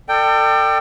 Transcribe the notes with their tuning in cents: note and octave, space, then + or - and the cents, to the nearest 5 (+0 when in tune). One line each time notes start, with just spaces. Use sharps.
A4 +30 D5 +35 G5 +0